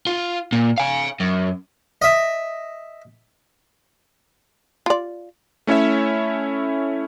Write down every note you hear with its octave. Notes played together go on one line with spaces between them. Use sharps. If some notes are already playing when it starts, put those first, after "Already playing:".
F4
A#2
F5 G#5
F#2
D#5 E5
F4 D5
A3 C#4 E4 C#5 E5